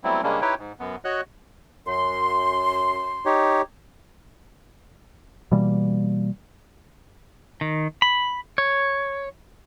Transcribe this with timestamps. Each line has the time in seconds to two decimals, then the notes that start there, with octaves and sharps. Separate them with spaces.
0.04 F#3 G3 A3 B3 C4 E4
0.23 C#3 G3 G#3 A#3 C#4 D4
0.41 D#4 E4 G4 B4 C#5 G5
0.58 G#2
0.80 F#2 B3
1.05 F#4 C#5 D#5 F#6
1.87 F#2 C6
3.26 D#4 G4 C#5
5.52 B2 E3 G3 A#3
7.61 D#3
8.02 B5
8.58 C#5